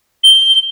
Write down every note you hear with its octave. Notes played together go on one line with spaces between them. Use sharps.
G7